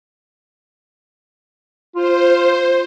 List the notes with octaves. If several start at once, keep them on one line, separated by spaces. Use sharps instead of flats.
F4 C5